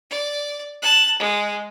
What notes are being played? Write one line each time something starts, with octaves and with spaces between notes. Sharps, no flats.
D5
A5 F#6
G#3